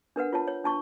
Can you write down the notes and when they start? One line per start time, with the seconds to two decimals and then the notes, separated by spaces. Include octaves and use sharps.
0.16 D4 A#4 B4 F#5
0.33 F4 C#5 A5
0.48 C#5
0.64 D4 A5 C#6